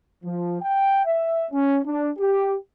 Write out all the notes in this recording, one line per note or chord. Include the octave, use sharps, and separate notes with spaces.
F3
G5
E5
C#4
D4
G4